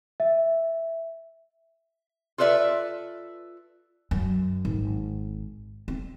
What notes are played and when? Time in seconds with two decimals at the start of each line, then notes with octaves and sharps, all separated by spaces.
0.20 E5
2.38 F4 A4 B4 D5 E5
4.11 F#2
4.65 G#1
5.88 C4